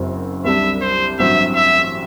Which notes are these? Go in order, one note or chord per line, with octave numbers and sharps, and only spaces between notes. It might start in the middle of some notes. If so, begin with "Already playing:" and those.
Already playing: F#1 F#2 F#3 C4
C2 C3 G3 D4 E5
C5
A1 G2 F#3 C4 E5
E5